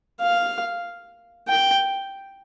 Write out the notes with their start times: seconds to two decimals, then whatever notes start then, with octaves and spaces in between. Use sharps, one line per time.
0.22 F5
1.48 G5